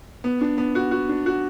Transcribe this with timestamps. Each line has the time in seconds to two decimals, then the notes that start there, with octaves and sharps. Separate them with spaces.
0.24 B3
0.41 D4
0.58 B3
0.75 F#4
0.91 F#4
1.09 D4
1.26 F#4